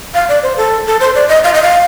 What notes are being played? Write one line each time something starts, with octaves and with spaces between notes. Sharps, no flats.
F5
D5
C5
A4
A4
C5
D5
D#5
F5
D#5
F5